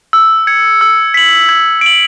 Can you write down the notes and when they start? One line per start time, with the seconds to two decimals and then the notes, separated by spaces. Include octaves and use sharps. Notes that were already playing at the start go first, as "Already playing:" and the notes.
0.13 E6
0.47 G#6 C#7
0.81 E6
1.14 B6 F#7
1.49 G#6
1.81 D7 F#7